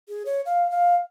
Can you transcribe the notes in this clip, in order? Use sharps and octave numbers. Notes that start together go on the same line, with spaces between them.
G#4
C#5
F5
F5